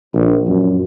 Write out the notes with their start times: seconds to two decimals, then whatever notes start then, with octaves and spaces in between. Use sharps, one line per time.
0.14 A#1
0.48 F#2